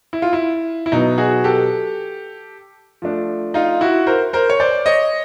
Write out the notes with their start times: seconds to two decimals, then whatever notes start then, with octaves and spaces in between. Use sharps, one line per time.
0.13 E4
0.22 F4
0.33 E4
0.86 E4
0.92 B2 F#3 B3 D#4
1.18 F#4 G#4
1.44 G4 A4
3.02 F3 A3 D4
3.54 D#4 F4
3.81 E4 F#4
4.07 A#4 C5
4.33 A#4 C5
4.50 C#5
4.60 C5 D5
4.86 C#5 D#5